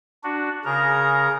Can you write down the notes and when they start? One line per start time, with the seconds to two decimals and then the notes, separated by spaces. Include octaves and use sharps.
0.24 D4 F#4
0.65 C#3 G#4 A#4 A#5